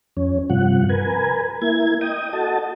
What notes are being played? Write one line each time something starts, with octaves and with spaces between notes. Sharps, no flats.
F2 C#4
G2 C3 F3 F#5
A#4 B4 G#5
A#3 E4 G#6
D#5 G5 D#6
F#4 A4 D#5 A5